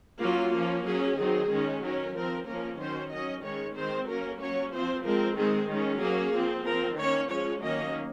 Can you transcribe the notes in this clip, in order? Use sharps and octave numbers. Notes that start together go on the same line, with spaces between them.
F#3 A#3 C#4 F4
F3 A#3 C#4
F#3 C#4 G#4
D#3 F#3 C4 G#4
D#3 G#3 C#4
F#3 C#4 A#4
F3 C4 A#4
F3 A#3 C#4 A#4
D#3 F#3 C#4 C5
F#3 C#4 D#5
D#3 G#3 C#4 C#5
D#3 G#3 C4 C5
F#3 A#3 C#4 A#4
F#3 C#4 C#5
F3 C4 C5
F3 G#3 C4 A#4
D#3 G#3 C4 G#4
D#3 G#3 C#4
F#3 A#3 C#4 G#4
F3 C4
F3 C4 A#4
D#3 A#3 C#4 C#5
F3 G#3 C#4 C#5
D#3 F#3 A#3 C#4 D#5